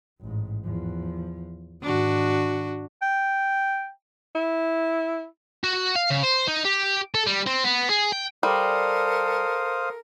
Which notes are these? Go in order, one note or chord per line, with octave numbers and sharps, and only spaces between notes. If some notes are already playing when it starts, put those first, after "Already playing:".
A1 G#2
E2 F3
G#2 D#3 D4 F#4
G5
E4
F#4
F5
C#3
C5
D#4
G4
A4
G3
C4
B3
G#4
G5
G3 A4 A#4 C5 F5 D#6